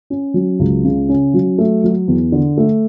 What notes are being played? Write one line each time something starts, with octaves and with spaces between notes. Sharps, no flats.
C#4
F#3
C#2
C#3
C#4
F#3
A3
F#3
E2
D3
A3